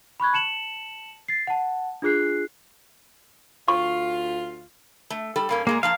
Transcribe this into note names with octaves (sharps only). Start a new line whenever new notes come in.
B5 C#6 F#6 G#6
A5 C#7 E7 F#7
A6 C7
F#5 A5
D4 F4 G#4 F#6 C7
D2 F4 C#6
A3
G3 A4
G2 A#3 C#4
A#2 G#3 A#3 G#4
F3 A#3 F5 A5